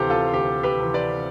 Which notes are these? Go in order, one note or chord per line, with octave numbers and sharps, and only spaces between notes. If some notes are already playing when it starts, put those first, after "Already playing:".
Already playing: D2 C3 E3 G4 A4 C5 F5
F4 A4
D2 G4
G4 B4
C3 E3
B4 D5